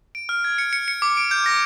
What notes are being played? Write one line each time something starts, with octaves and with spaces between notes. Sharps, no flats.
D7
F6
G#6
C#7
C#7
C#7
D6
D7
G6
A#6